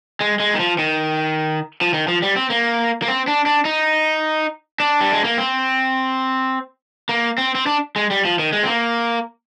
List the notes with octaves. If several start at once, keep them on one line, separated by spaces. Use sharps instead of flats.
G#3
G#3
D#3
F3
D#3
F3
D#3
F3
G3
C4
A#3
A#3
C4
D4
D4
D#4
D4
G3
G#3
A#3
C4
A#3
C4
C4
D4
G#3
G3
F3
D#3
G#3
C4
A#3